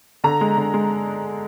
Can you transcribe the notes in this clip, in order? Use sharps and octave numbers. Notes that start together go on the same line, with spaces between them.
D3 A#5
G#3
D3
G#3